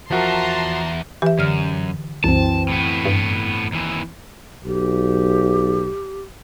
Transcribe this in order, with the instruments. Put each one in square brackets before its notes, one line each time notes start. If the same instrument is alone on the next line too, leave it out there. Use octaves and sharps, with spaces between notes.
[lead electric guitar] E2 E5 [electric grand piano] F3 F#4 A#4 [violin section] A5 A#5 C6
[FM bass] E3 [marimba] G4 E5
[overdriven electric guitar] F#2 [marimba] D3 F6
[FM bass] C2 [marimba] F#2 [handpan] E3 C4 [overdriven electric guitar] A5
[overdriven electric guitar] A2 B3
[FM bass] G2
[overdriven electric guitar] D#2 E3
[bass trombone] B1 [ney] G4